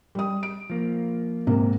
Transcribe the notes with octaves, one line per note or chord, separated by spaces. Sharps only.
G3 D#6
D7
F3 A#3
G#2 C3 A#3